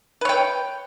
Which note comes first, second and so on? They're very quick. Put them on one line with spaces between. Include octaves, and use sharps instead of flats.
B4 C#5 G5